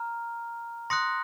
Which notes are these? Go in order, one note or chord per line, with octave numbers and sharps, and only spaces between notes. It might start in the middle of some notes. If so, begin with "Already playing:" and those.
Already playing: A#5 F6
C6 D#6 F#6 A#6 C#7